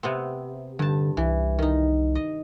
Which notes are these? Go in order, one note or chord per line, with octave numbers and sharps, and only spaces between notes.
C3 B3 C4
G2 D3 A5
C2 E3
D#3 D#4
D#5